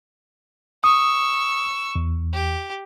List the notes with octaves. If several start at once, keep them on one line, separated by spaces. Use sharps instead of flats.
C#6 D#6 E6
E2
G4